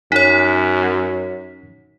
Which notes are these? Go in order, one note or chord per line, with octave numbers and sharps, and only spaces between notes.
F#2 D#4 C#5 B6